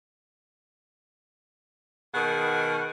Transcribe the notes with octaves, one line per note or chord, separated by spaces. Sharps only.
B2 D#3 G#4 F#5